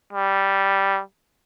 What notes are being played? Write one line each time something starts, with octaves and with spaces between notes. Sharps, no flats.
G3